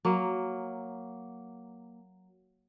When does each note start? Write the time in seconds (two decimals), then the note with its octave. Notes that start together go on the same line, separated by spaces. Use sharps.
0.05 F#3 A#3